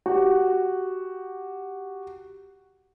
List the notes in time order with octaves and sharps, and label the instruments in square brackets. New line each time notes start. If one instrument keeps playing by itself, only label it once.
[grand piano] F#4 G4